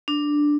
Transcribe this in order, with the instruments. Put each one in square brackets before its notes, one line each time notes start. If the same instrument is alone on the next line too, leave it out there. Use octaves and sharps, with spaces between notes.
[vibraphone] D4